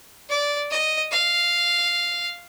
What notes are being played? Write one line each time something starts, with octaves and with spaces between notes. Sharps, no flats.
D5
D#5
F5